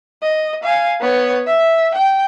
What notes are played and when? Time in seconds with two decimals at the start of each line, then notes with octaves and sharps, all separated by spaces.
0.23 D#5
0.63 F5 G#5
1.01 B3 C#5
1.47 E5
1.95 G5